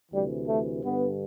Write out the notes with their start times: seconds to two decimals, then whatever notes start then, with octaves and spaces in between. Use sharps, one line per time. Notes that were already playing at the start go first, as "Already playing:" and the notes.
0.12 D2 C3 E3 G3
0.47 A3
0.84 G2 D3 B3